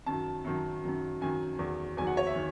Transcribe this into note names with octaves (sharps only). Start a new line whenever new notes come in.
F#2 D#3 F#3 A5
F#2 D#3 F#3
F#2 D#3 F#3
F#2 D#3 F#3 G#5
E2 D#3 F#3
E2 D#3 F#3 G#5
F#5
C#5
E5
D#3